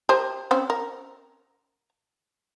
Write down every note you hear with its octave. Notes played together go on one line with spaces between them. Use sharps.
G4 A#4 C5
C4 C#4
A#4